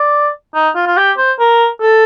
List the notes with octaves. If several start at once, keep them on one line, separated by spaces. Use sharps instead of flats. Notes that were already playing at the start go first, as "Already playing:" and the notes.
Already playing: D5
D#4
F4
F4
G4
C5
A#4
A4